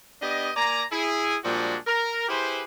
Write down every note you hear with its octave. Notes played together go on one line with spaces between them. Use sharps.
B3 D4 G4 D#5
A#3 D5 G#5 A#5
E4 G#4
A#2 F3 G3 G#3 D4 F#4
A#4
E4 G4 G#4 B4 C5